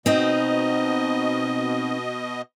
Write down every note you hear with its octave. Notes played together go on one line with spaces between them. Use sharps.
B2 C4 D#4 D#5